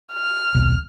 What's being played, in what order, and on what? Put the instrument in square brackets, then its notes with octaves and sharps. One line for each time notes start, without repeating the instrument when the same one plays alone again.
[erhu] F6
[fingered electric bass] D#1 B1